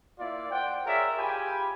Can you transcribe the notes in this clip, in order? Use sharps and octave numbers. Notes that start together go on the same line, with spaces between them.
A#3 E4 F4 D5
C5 D5 F#5 G5
F4 G#4 A#4 C#5 D5 E5
F4 G4 G#4 G5 G#5 B5